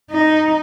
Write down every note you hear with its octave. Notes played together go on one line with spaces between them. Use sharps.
D#4